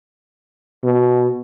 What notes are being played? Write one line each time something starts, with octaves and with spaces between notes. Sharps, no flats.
B2